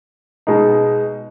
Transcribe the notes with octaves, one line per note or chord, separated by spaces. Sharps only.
B2 G#3 D#4